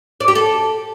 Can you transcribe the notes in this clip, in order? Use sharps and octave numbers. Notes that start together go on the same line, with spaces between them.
D5
G4
A4